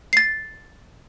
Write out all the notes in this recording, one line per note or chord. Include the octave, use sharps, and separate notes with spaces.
A6 C7